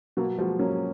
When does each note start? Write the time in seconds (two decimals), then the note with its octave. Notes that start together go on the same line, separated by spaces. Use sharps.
0.17 B2 F#3 A#3
0.38 B2 F3 G#3
0.59 F#3 A#3 C#4